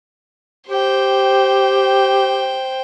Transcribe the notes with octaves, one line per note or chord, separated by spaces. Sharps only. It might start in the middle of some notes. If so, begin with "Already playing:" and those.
G4 C5 G5